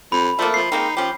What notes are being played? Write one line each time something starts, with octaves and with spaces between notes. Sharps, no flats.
F2 B5
F3 A3 A#3
F3 C7
G#3 A#3 C4 D#4
F3 C#4 G4